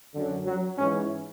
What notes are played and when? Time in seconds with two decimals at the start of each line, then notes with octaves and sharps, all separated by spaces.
0.13 F#2 D3
0.46 F#3
0.78 G#2 E3 C#4